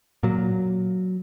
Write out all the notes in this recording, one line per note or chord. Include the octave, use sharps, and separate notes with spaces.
A#2 F#3